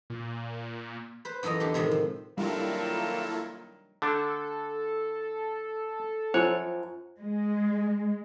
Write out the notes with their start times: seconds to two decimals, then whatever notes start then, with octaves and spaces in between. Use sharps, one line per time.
0.10 A#2
1.25 B4 C5
1.43 F#2 E3 F4 A4 D#5 A#5
1.60 E2 D3 G4 C6
1.74 A2 C3 D#3 F3 G#3
1.91 F3
2.38 D#3 F#3 G3 A#3 E4 F4 A4
4.02 D3 A3 D4 A4
6.34 F#2 F3 C5 C#5
7.19 G#3